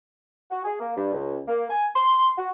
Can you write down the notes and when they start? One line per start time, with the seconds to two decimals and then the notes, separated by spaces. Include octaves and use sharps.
0.51 F#4
0.64 G#4
0.80 A#3
0.96 G2
1.13 C#2
1.47 A#3
1.70 G#5
1.96 C6
2.38 F#4